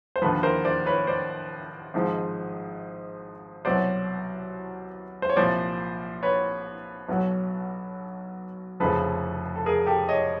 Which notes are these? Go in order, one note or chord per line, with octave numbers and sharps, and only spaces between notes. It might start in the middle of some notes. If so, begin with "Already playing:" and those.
C5
D#2 D3 F3 A4 B4
A#4 C5
C5 D5
B4 C#5
C5 D5
G#1 G#2 F3
C2 B2 F#3 C5 D5
C5
C#5
C2 A#2 F3 C5 D5
B4 C#5
B1 B2 F#3
F1 F2 C#3 F3 A4 B4
A4
G#4 A#4
G4 A4
C#5 D#5